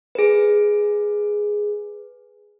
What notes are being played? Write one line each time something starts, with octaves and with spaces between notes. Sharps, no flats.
G#4 B4